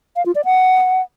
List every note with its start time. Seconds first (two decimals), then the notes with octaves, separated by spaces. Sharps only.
0.16 F5
0.26 F4
0.35 D5
0.45 F#5